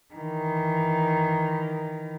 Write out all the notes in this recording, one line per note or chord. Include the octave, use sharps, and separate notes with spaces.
D#3 E3